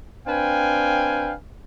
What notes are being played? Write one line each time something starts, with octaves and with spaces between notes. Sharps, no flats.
C4 D4 B4 F5 G5 G#5